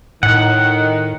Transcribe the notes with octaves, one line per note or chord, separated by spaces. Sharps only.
A2 D#3 F#5